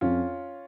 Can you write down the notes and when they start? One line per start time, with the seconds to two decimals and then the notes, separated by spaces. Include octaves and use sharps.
0.01 F2 C#4 F4